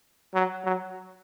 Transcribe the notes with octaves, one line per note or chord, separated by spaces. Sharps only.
F#3
F#3